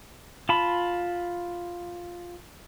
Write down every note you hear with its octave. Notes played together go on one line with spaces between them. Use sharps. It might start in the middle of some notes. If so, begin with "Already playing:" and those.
F4 A5 B5